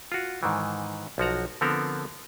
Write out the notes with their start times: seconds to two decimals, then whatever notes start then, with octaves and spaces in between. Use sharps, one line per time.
0.12 F4 F#4
0.43 G#2 D#3 E3
1.18 B1 F3 F#4 A#5
1.61 D3 F3 B3 C4 A4 A#4